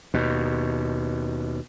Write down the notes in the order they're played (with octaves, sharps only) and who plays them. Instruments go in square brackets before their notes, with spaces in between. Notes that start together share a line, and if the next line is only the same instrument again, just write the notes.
[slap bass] D#2 B2